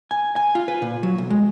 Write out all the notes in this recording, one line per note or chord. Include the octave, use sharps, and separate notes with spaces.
G#5
G#5
F4
B4
A#2
F#3
B1
G#3